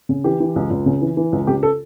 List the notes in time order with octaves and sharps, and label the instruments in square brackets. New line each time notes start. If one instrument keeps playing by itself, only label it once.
[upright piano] C#3
E3 G4
E3
C#2
C#2
C#3
E3
E3
C#2
C#3 G4
A4